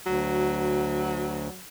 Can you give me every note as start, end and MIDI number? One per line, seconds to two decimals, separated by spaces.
0.06 1.49 38
0.06 1.62 54